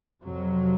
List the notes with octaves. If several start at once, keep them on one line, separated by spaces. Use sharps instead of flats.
F2 C3 F#3